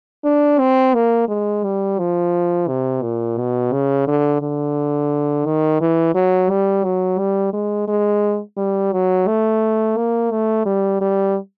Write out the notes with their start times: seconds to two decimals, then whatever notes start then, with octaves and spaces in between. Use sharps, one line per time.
0.24 D4
0.59 C4
0.94 A#3
1.28 G#3
1.64 G3
1.99 F3
2.68 C3
3.02 A#2
3.38 B2
3.72 C#3
4.07 D3
4.42 D3
5.46 D#3
5.81 E3
6.15 F#3
6.50 G3
6.84 F#3
7.18 G3
7.53 G#3
7.88 G#3
8.57 G3
8.92 F#3
9.28 A3
9.97 A#3
10.31 A3
10.65 G3
11.01 G3